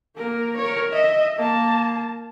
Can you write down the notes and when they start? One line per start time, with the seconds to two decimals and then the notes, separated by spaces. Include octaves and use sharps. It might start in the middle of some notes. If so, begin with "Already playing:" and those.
0.17 A#3 A#4
0.58 A#4 C#5
0.92 D#5 E5
1.37 A#3 A5